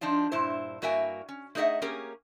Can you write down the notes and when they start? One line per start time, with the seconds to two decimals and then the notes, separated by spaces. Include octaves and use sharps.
0.01 F3 D4 D#4 F4
0.32 G2 A#2 E4 C5
0.82 G2 A#3 F#4 E5 G5 G#5
1.29 C#4
1.55 A3 D#4 G#4 D#5 E5 F#5
1.82 A#3 C#4 G4 G#4 A#4